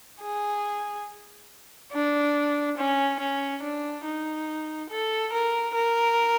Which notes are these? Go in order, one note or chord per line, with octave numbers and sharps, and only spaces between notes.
G#4
D4
C#4
C#4
D4
D#4
A4
A#4
A#4